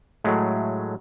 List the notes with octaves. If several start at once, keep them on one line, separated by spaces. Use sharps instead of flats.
A2 F#3 G#3 A3